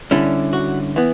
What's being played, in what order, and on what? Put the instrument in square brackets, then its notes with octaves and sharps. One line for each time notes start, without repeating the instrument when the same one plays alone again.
[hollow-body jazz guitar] D3 G3 C#4 E4
F#4
E3 B3